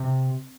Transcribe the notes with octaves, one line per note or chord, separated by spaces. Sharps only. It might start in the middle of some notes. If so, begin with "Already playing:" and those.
Already playing: C3 C4